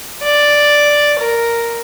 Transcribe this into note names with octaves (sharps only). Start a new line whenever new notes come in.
D5
A#4